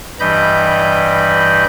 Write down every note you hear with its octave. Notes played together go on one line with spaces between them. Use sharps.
G2 E3 G3 D#5 B5 G6